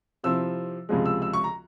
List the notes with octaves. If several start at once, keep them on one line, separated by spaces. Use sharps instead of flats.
C3 F3 C4 E4 E6
C#2 C3 F3 G#3
E6
E6
C#6
A#5